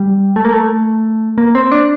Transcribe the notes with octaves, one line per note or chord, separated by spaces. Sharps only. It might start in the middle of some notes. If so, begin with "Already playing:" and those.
Already playing: G3
A3
A#3
A3
A#3
C4
D4